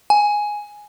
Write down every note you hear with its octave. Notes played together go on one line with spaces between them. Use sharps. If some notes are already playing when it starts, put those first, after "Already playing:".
G#5